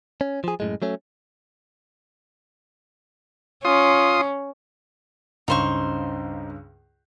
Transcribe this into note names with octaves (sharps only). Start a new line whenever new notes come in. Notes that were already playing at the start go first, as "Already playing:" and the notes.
C#4
F3 G#4
F#2 A2 G#3
F#3 A3 C#4
C#4 F4 C6 D#6
C#2 G2 C#3 D#4 C5 C#6